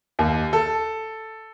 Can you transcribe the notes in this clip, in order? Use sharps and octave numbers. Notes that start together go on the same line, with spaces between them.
D#2
A4